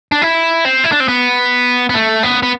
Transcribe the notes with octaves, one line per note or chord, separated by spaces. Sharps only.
D4
E4
C4
E4
D4
C4
B3
B3
A3
B3
B3